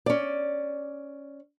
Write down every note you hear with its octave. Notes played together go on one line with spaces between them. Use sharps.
C#4 D5